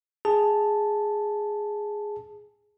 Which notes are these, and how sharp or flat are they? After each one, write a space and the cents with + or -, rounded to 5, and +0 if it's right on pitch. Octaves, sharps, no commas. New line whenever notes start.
G#4 +0 A5 +0